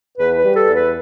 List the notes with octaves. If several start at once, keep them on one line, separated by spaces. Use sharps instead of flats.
E2 B4
B4
G3
A4
E2
B4